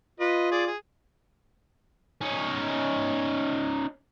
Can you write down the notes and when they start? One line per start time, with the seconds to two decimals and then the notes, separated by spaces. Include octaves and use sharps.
0.20 F4 B4 D#5
0.51 G#4 D5
0.67 G#4
2.21 C#4 D#4